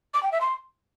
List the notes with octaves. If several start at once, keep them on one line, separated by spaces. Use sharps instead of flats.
D6
G5
E5
C6